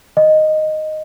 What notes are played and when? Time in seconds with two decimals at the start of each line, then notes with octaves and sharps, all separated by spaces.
0.17 D#5